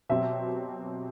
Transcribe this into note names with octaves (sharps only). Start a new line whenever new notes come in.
B2 F#3 C4 G4 E5